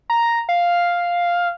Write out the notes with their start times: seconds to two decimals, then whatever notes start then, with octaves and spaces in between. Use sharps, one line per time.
0.10 A#5
0.49 F5